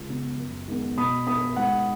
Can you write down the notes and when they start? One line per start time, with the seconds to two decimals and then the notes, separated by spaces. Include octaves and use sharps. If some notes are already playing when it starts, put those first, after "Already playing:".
Already playing: C#2
0.09 C#3 B3
0.38 F#2
0.68 D#3 G#3 B3
0.97 B2 B5 D#6
1.27 B3 B5 D#6
1.56 G#2 F#5 B5